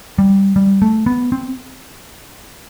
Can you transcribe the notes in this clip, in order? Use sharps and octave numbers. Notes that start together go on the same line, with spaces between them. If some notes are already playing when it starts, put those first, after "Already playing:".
G3
G3
A3
B3
C4